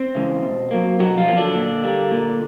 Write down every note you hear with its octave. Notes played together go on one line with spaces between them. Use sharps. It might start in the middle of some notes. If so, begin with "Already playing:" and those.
Already playing: C4 C5
C#3 E3 G#3
B2
F#3 A#3
B2 F#3 F#4
F3 F4
F#3 A#3
D3 D4
A#2
G3 A#3
A#2